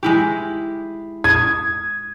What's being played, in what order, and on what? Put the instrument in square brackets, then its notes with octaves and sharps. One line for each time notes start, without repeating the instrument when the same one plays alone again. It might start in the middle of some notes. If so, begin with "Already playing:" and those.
[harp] G#3 E4 G4
[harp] D#6 [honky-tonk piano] G#6